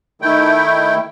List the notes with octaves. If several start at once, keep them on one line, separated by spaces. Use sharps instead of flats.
D#3 A3 E4 G5